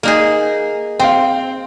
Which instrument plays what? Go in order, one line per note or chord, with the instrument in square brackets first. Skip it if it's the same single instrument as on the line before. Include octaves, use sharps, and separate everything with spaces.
[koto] A#3 D#4 G#4
[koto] C4 [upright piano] F5 G5